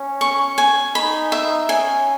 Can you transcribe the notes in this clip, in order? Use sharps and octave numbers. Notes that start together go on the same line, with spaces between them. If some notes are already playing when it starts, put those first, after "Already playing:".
Already playing: C#4
C#6
G#5
D#4 B5
E5
C#4 G#5